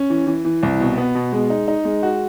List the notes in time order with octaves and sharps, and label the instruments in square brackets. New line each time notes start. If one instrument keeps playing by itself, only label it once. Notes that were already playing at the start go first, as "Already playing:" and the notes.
Already playing: [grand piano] C#4
E3
E3
E3
C2
B2
B3
B2
G#3
D#4
D#4
G#3
F#4